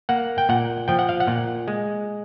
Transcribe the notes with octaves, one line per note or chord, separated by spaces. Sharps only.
A#3 F#5
G5
A#2 F#5
F3 G5
F#5
F5
F#5
A#2
G#3